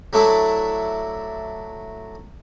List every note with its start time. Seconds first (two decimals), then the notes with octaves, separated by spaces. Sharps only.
0.13 F#3 A3 D4 E4